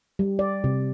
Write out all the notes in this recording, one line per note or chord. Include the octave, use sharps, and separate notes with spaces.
G3
D5
C3